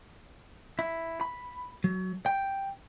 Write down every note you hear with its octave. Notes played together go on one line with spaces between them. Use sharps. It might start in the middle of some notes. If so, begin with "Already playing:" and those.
E4
B5
F#3
G5